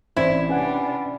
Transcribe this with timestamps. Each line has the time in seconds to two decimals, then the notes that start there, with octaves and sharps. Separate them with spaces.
0.16 A1 C4 E4 C5 D5 G#6
0.49 C3 G3 C#4 D4 B4 F#5 G#5